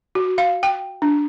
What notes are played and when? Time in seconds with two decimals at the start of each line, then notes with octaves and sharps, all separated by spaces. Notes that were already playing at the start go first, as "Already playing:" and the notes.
0.15 F#4
0.38 F5
0.63 G5
1.02 D4